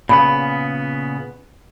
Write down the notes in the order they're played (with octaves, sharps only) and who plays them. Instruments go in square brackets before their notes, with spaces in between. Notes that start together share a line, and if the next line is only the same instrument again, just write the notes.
[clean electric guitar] A#2 C#3 B3 [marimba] B5